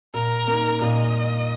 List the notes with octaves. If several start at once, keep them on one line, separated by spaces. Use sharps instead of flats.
A#2 A#4
A#3 D#4
A#2 D#5